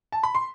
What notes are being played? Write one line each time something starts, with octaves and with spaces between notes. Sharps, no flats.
A5
B5
C6